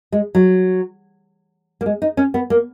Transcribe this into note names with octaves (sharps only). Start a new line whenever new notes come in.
G#3
F#3
A#3
G#3
D#4
C#4
B3
A#3